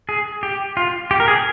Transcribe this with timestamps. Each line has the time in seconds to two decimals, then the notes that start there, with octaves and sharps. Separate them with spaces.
0.09 G#4
0.43 G4
0.77 F4
1.11 G4
1.20 A#4
1.28 G#4